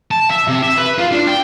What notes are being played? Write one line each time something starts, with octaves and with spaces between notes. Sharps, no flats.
A5
E5
C3
E5
B4
F4
D4
G5